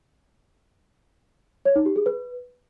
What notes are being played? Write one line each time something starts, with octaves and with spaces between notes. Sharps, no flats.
C#5
D#4
G4
G#4
B4